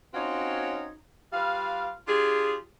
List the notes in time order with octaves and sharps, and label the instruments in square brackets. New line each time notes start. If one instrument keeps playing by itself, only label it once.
[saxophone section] C4 C#4 D#4 F4 F#4 C#5
G3 F4 B4 F5
D4 F4 G4 G#4